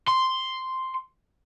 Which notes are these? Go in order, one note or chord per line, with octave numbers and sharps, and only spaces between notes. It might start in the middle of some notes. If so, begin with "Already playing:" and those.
C6